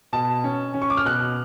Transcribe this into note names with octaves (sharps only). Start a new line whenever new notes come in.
B2 A5
C#4
C#4
C#6
D6
F6
B2 F#6